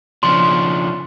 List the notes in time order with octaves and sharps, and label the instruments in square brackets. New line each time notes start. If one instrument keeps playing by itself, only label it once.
[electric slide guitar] C#3 F3 D4 [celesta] C6